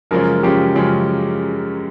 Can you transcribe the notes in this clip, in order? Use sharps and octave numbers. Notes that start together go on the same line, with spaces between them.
F#2 C#3 F3 G#3 C#4 A#4
F#2 C#3 F3 G#3 C#4 G4
F#2 C#3 F3 G#3 C#4